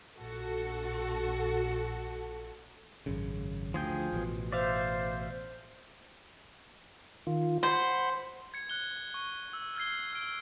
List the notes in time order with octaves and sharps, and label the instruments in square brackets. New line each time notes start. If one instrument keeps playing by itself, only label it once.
[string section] A#1 F#4 A4
[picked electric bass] G#1 F#2 C#3
[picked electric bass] D2 [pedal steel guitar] F3 G#4 G5
[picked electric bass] A1 B2
[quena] C5 [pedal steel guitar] D5 E5 F5
[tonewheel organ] D#3 F4
[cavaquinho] C5 [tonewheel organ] F#5 B5 C6
[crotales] G#6 C#7
F#6 G7
C#6
E6
F6 G#6 C7 G7
F6 D7